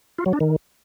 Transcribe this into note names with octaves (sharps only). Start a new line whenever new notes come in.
F4
F#3
D4
D#3